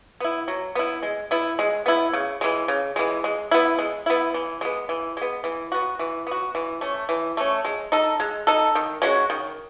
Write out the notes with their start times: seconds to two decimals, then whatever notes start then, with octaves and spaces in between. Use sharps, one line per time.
0.20 B3 E4
0.48 F#3
0.75 B3 E4
1.03 G#3
1.31 B3 E4
1.59 G#3
1.86 B3 E4
2.13 C#3
2.41 E3 G#3
2.68 C#3
2.96 E3 G#3
3.24 G#3
3.51 B3 E4
3.79 G#3
4.06 B3 E4
4.34 E3
4.61 G#3 B3
4.89 E3
5.17 G#3 B3
5.44 E3
5.72 B3 F#4
5.99 E3
6.27 B3 F#4
6.55 E3
6.81 A3 C#4
7.09 E3
7.37 A3 C#4
7.65 G#3
7.92 D#4 A4
8.20 G#3
8.47 D#4 A4
8.75 D#3
9.02 G#3 C#4 F#4
9.30 D#3